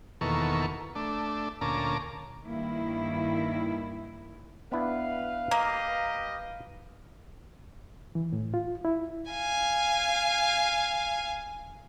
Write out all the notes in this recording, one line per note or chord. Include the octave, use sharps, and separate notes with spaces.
E2 B2 D#3 A#3 A4 C#6
A3 D4
D2 A#2 C#4 A5 A#5 D6
G2 D#3 A#3 E4
B3 D4 E4 B4 F5
A#3 G4 D#5 A#5
E3
A2
F4
E4
F5 G#5